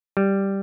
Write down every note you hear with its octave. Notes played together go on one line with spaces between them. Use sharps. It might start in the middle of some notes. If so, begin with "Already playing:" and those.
G3